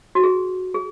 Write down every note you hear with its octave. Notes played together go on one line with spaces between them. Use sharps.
F#4
G#4
G#4